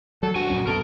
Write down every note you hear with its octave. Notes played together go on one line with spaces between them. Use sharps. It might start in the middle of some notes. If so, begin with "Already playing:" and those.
F#3 A4
D2 G2 F#4 G#5
A#1 F#2 C#4
F#2 B2 A4 A#4